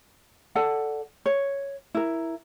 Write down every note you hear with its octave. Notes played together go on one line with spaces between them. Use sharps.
A4 D5 F#5
C#5
E4 A#4